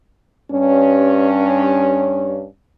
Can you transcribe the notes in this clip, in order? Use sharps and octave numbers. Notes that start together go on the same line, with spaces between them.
G2 C#4